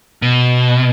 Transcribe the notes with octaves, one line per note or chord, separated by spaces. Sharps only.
B2